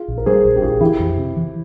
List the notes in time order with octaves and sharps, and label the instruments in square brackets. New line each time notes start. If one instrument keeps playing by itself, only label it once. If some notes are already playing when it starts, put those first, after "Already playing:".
Already playing: [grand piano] F4 G#4
[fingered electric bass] A#1
[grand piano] A#4
[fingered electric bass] G3 [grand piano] G#4 C5
[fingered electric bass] A#1
[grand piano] G4
[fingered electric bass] A#1 [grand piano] F4 G#4
[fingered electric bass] E3 [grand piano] E4 G4
[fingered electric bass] F2
C3
E3